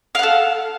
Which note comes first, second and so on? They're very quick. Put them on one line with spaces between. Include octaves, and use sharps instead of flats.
F5 F#5 A4